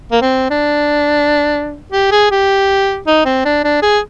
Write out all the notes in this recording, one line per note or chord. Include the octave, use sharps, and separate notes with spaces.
A#3
C4
D4
G4
G#4
G4
D#4
C4
D4
D4
G#4